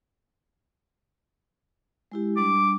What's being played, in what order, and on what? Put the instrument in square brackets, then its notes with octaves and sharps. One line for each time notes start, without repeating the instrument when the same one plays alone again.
[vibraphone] G#3 E4 G4
[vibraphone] G3 D4 [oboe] D6